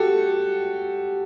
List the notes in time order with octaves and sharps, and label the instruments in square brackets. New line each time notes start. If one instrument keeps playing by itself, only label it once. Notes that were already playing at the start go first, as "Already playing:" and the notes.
Already playing: [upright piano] F#4 G4 A4